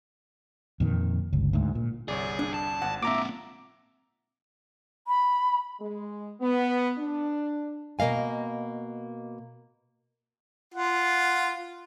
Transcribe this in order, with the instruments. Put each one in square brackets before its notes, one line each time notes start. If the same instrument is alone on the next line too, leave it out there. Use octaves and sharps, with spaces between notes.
[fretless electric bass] F2 A#2 D#3
G1 C#2
D2 G#2
A#2
[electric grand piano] G1 C2 C#5 [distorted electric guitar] G#4 [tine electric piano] D5
[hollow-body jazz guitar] D4
[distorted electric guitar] A5
[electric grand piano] G#1 [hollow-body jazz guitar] F#5
[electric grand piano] A#2 [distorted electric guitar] A#3 C4 [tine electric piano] E5 A#5 D6
[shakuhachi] B5
[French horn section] G#3
B3
D4
[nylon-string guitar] B2 A#3 D#5 F5 G#5
[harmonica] F4 F#5